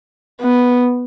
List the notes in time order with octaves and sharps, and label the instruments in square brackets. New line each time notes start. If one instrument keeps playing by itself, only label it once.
[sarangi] B3